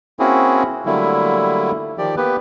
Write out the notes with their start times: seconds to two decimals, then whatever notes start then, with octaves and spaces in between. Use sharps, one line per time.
0.19 A#3 C4 C#4 E4 F#4 G#4
0.86 D3 F#3 G3 A3 A#3 E4
1.98 D#3 F3 G4 D5
2.17 A#3 B3 G4 B4